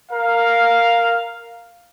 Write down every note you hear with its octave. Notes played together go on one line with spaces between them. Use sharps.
A#4 F5